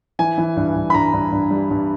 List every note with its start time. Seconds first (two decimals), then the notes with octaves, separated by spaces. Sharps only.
0.19 E3 G#5
0.38 E3
0.57 G2
0.75 G2
0.90 B5
0.94 G2 A#5
1.13 G2
1.32 G2
1.50 G3
1.70 G2